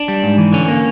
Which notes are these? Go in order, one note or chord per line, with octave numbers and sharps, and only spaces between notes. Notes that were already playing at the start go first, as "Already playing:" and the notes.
Already playing: D4
G3
G#2
E3
D3 C#4
A#3